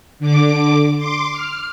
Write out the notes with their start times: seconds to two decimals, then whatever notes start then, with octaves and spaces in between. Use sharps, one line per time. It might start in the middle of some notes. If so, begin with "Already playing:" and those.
0.19 D3 D6
0.96 C6 D6
1.33 F6